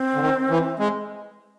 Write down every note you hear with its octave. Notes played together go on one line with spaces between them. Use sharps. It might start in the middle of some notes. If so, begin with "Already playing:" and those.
Already playing: C4
D3
D#3
E3
G#3